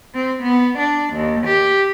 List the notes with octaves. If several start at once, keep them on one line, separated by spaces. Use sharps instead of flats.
C4
B3
D4
D#2
G4